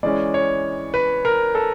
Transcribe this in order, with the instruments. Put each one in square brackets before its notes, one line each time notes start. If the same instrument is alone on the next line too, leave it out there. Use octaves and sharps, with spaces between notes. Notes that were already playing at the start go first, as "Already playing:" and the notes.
[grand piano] E3 G#3 C#4 D5
C#5
B4
A#4
A4